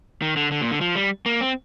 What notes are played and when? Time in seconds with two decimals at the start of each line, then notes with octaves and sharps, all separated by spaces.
0.22 D#3
0.36 D3
0.52 D3
0.61 A#2
0.71 D3
0.81 F3
0.96 G3
1.26 A#3
1.41 C4